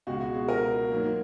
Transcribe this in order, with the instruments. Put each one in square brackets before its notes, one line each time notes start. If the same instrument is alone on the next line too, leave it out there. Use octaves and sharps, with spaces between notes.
[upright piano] C#2 B2 G#3 F#4
F#4
G#4
A#4
G#2 F#3 A#3